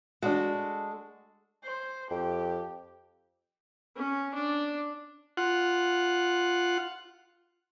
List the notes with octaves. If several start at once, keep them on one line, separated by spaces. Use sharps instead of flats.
G#3 D4 F#4 A4
C5
F2 G4
C#4
D4
F4 F#5